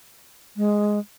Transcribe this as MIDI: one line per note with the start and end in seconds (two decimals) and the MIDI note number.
0.57 0.99 56